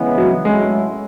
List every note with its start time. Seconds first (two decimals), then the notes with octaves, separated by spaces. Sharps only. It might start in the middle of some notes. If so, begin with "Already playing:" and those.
Already playing: C#3 E3 G#3 B3
0.18 F#3
0.45 A2 F#3 G#3 A3 C#4 E4